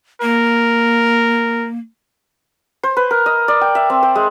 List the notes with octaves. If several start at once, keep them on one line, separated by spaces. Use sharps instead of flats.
A#3 A#4
C5
B4
A#4
D#5
D5
G5
E5
C4
C5
G#3